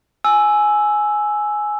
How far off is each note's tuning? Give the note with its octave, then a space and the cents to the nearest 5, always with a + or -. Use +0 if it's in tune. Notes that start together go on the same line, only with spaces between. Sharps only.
G#5 +10 E6 +0